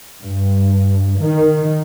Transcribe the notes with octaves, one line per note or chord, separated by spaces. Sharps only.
G2
D#3